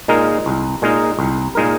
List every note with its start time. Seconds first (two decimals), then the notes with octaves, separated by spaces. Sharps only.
0.08 A#2 G#3 D#4 A#4
0.46 C2
0.82 A#2 G#3 D#4 A#4
1.19 C2
1.55 A#2 G#3 D#4 A#4